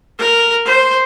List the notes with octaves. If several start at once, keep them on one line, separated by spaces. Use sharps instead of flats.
A#4
C5